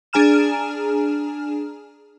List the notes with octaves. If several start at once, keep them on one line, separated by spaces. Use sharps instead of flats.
D4 G#4 G#5 A#5 F6 E7